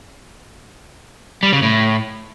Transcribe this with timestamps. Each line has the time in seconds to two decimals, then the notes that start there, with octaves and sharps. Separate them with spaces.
1.43 G3
1.53 C#3
1.63 A2